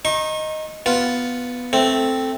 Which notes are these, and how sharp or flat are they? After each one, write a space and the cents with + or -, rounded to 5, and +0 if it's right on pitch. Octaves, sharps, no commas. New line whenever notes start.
D#4 +0 C#6 -40
B3 +0 F4 +0
A3 +0 C4 +0